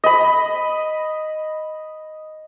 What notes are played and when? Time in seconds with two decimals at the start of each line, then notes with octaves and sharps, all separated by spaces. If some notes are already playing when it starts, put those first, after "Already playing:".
0.04 D#5 B5